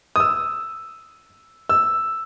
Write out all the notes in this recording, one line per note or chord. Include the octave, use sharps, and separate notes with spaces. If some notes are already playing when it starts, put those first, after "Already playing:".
D#6
E6
E6